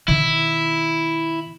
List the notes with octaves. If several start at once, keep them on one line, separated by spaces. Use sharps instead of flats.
B2 D#3 E4